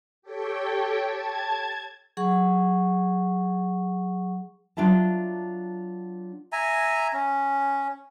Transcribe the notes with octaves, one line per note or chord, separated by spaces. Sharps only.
G4 A4 C#5 G5
A5 G#6
F#3 G#4 F#5 C#6
F#3 D4 F4 E5 A5
E5 G#5 A#5
C#4